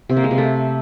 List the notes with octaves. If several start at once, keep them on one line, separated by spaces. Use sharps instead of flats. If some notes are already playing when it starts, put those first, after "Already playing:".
C3
A#3
G#3
C3
A3